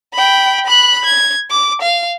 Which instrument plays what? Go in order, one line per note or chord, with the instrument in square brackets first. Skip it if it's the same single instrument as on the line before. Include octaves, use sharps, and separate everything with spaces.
[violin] G5 B5
B5 F#6
G#6
D6
F5